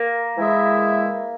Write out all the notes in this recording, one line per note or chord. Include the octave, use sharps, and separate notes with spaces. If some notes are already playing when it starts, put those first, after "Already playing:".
Already playing: A#3
E3 G#3 E4 G#4 E5